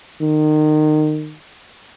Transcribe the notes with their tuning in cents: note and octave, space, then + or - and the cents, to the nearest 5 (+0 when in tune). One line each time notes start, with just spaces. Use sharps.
D#3 -25